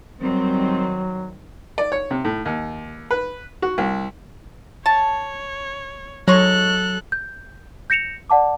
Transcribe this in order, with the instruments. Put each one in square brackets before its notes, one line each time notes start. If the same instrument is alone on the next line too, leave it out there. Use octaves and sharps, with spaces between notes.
[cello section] D#3 G3 C4 [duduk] F#3
[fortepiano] D5
C#5
C3
A2
D#2
B4
F#4
C2
[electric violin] C#5 [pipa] A5
[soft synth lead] F#3 [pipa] G#3 D#4 C#5 [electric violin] A4 F#6
[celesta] G6
G6 A#6 C#7 E7 F7
D5 F#5 A5 D6